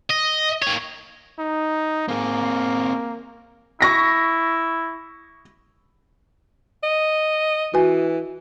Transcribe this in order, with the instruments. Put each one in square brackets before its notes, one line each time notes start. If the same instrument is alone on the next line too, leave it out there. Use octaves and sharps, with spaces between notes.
[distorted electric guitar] D#5
A#3 C#5
[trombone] D#4
[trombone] A#3 [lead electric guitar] C4 G#4
[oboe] E4 [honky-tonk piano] C#6 A#6 B6
[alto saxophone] D#5
[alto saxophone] E3 [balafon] F#4 B4 G#5